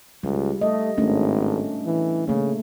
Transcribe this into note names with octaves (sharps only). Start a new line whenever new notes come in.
C#2 G3
A3 D#5
G#1 A3 C#4 D4
E3
C#3 A3 A#3